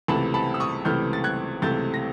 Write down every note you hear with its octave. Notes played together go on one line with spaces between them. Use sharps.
C#2 C3 E3 A3 A5 B5
A5 B5
E6
C#6 D#6
C#2 C3 E3 A3 F6 G6
A6
F#6 G#6
C#2 C3 E3 A3 G6 A6
A#6